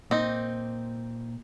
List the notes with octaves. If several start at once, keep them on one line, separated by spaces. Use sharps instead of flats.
A#2 A#3 C4 D#4